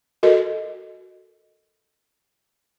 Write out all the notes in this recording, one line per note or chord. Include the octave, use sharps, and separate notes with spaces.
F#4 A4 A#4 D#5